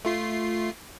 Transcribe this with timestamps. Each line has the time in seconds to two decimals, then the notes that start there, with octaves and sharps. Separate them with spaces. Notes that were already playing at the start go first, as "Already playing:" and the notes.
0.05 A3 F4 C7